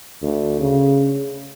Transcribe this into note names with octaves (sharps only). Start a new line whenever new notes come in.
D2
C#3